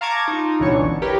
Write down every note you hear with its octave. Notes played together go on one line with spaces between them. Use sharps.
F5 A5 A#5 C#6 D6 G#6
D#4 F4
C#2 B2 E3 D4 C#5 C#6
G1
E4 G4 A#4 B4 C#5